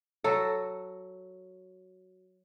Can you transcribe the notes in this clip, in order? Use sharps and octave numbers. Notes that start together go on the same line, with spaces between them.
F#3 F#4 A4